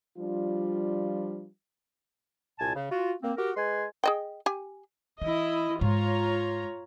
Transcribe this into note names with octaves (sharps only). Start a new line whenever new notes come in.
F3 G3 D4 F4
C2 A#2 G#5 A5
C#3
F4 F#4
A#3 C4
F#4 G4 A#4
G#3 B4 G#5 C6
G#4 D#5 G5
G4 G#5
E3 E4 D#5
G#2 F4 C#5 A#5